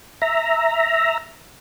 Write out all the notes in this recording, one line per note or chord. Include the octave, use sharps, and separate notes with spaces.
E5 A#5